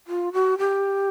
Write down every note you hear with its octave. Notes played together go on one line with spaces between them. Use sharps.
F4
F#4
G4